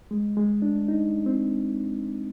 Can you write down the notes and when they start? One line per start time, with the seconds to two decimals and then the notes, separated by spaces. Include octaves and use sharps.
0.11 G#3
0.37 G#3
0.62 D4
0.88 D#4
1.26 C4